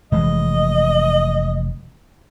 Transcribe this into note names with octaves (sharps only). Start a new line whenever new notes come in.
F1 E3 G#3 D#5